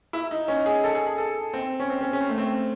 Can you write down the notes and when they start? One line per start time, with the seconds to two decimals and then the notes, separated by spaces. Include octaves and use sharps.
0.13 E4
0.31 D#4
0.48 C#4
0.66 G#4
0.84 A4
0.95 G#4
1.07 G#4
1.18 A4
1.53 C4
1.80 C#4
1.90 C4
2.01 C#4
2.13 C#4
2.21 C4
2.29 A3
2.38 C4